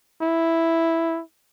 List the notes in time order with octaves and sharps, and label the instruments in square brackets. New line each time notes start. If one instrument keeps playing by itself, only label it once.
[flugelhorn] E4